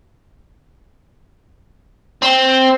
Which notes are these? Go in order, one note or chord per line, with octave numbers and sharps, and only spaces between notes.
C4